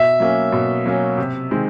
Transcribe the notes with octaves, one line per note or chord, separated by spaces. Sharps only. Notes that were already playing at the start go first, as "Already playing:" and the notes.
Already playing: B2 E5
F#3 A#3 C#4
B2
F#3 A#3 C#4
C3
D#3 G#3 C4